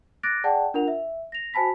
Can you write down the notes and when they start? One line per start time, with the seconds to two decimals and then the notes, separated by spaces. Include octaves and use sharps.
0.23 D6 F#6 A6 A#6 D7
0.44 G#4 D5 F#5 G5 A5
0.74 D4 F4 A#4 F#5 F7
0.88 E5
1.32 A#6 F7
1.54 F#4 C5 G#5 A5 B5 B6